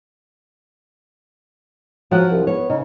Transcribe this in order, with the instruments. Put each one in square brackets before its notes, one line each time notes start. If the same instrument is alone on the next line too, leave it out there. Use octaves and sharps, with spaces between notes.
[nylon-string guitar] F3 F#5 [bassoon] F#3
[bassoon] C2
[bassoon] B3 [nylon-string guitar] C#5
[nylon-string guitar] C#3 [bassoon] D#4